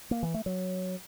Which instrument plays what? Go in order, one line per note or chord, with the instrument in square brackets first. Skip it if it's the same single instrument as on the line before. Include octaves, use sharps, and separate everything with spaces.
[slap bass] A#3
E3
A3
F#3